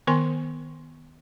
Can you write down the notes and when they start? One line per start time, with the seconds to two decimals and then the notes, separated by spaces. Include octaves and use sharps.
0.07 D#3 B3 A#4 G#5 C6